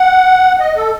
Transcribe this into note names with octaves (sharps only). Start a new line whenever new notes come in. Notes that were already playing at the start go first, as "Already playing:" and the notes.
Already playing: F#5
D#5
A4